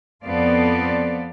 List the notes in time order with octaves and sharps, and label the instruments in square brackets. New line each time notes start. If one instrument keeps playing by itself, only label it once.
[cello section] F2 B3 A4 C5 D5 F5